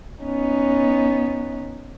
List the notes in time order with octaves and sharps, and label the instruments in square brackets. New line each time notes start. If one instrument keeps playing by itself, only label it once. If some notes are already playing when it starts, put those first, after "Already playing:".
[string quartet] B3 C#4 D#4